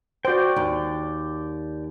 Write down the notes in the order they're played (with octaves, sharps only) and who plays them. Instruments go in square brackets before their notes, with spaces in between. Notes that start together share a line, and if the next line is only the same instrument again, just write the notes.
[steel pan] F#4 C5 [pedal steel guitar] D5 G5
[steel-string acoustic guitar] D#2